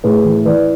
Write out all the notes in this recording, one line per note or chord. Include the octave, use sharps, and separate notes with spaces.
A2 G#4 B4
E3
E3 B4 D5